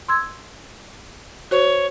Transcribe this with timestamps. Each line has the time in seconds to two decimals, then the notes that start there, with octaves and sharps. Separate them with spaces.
0.08 C6 E6 G#6
1.51 F#4 C5 C#5